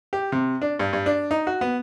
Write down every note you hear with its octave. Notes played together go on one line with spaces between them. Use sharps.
G4
C3
D4
G2
G2
D4
D#4
F#4
B3